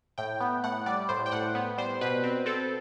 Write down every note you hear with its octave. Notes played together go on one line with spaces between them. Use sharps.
A2 G5
B3
A2 F#5
G3 D5
A2 C5
G5
A2 F#5
B3
G3 C5
B2 B4
C4
C4 A4